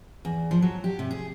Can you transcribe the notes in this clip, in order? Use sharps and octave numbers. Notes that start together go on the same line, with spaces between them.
E2
F3
F#3
G4
C3
G#4